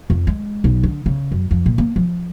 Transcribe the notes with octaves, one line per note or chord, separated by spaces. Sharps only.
F2
G#3
B1
D3
C#3
F#2
F2
A#2
A#3
F3